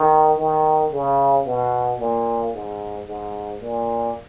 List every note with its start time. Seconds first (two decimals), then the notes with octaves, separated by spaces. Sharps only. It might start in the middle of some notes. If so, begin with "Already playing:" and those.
Already playing: D#3
0.38 D#3
0.92 C#3
1.46 B2
2.00 A#2
2.53 G#2
3.07 G#2
3.61 A#2